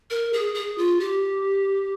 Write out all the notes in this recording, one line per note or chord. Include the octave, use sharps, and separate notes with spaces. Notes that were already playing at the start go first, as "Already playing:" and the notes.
A#4
G#4
G#4
F4
G4